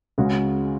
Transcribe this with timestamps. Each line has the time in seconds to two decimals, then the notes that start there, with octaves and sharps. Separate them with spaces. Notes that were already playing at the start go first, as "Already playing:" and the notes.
0.18 C#2 C#3 G#3 C#4 F#4